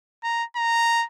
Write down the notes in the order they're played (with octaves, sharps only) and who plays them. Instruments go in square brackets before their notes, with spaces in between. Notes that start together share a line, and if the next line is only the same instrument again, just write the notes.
[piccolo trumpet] A#5
A#5